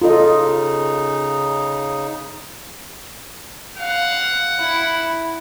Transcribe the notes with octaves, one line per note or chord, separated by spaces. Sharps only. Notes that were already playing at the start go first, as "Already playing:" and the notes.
C#3 D#4 F4 A4 D#5
F5 F#5
E4